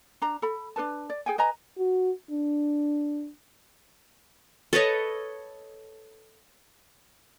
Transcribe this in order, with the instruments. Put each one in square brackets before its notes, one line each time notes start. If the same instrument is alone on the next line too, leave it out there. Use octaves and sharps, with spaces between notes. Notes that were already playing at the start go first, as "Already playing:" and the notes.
[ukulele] D4 A#5
A4 B5
D4 A4 B4 A5
D5
G#4 G5 G#5
B4 D#5 G#5 A#5
[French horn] F#4
D4
[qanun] A4 B4 C#5 D#5